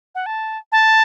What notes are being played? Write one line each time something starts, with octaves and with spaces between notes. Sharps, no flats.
F#5
A5
A5